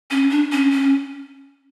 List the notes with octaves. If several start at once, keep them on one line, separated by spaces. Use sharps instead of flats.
C#4
D4
C#4
C#4